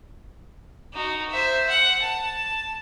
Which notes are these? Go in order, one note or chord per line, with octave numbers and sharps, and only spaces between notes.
D#4 F#4
C5 E5
F#5
A5